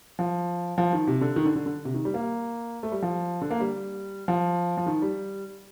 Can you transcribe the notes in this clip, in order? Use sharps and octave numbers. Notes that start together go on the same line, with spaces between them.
F3
F3
D#3
C3
D3
D#3
D3
D3
D3
C3
D#3
G3
A#3
A3
G3
F3
D3
A#3
G3
F3
F3
D#3
G3